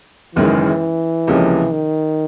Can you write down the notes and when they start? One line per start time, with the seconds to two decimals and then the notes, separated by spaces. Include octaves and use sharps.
0.35 F#1 F#2 D#3 E3 G#3
1.27 C#2 C3 F3 A#3 C#4
1.73 D#3